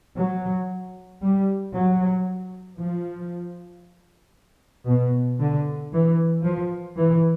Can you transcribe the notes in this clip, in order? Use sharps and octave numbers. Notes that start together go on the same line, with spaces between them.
F#3
G3
F#3
F3
B2
D3
E3
F3
E3